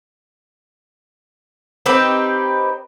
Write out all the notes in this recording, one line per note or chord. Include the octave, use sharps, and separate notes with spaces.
C4 D#4 G4 B4